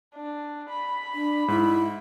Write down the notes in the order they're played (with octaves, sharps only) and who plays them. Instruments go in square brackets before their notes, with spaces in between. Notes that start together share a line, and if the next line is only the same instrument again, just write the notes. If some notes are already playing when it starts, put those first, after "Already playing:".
[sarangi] D4
B5
[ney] D4
[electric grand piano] G#2 [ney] E4